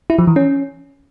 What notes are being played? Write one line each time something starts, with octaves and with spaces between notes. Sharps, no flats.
E4
F3
E3
C#4